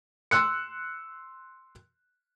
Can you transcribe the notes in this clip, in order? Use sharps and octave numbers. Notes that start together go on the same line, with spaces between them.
C6 E6 F#6 C#7